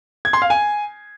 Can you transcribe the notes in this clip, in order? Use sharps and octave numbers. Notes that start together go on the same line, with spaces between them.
G#6
C6
F5
G#5